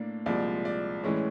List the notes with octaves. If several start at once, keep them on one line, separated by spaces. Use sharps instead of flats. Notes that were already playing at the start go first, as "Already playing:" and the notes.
Already playing: A2 A#3 D4
C2 A#2 F3 G#3 D5
D5
A2 E3 G#3 C#4